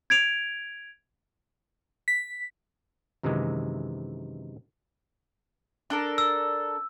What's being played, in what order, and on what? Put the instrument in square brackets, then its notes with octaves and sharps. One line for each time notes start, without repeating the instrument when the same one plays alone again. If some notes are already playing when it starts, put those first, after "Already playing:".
[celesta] G#6 D7 F7
[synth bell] B6
[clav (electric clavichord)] F#2 C3 D#3 E3 G#3
[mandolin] D4 A4 A#4
[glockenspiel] E6